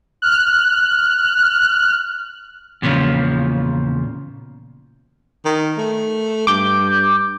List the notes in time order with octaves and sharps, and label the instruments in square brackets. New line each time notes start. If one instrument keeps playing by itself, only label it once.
[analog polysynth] F6 F#6
[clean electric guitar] E2 A#2 C#3 F3
[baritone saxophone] D#3
A3
[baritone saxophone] G2 [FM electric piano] D6 G6